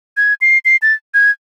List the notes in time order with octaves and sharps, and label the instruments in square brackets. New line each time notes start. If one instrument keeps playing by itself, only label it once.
[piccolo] G#6
C7
C7
A6
G#6